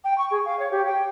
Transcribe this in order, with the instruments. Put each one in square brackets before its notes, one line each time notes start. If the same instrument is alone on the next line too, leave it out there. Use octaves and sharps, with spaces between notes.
[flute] G5
C#6
G#4
F5
C#5
G4
G5